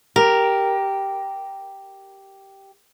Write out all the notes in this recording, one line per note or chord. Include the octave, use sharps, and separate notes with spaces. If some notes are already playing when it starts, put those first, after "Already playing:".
G4 A#4